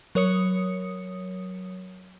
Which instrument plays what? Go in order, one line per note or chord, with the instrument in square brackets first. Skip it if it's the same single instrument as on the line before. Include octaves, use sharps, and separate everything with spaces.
[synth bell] F#3 A#4 C#5 D#6 C#7